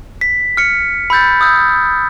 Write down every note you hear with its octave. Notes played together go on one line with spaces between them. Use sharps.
B6
F6 C#7
B5 E6 G6 A6
D#6 E6 G6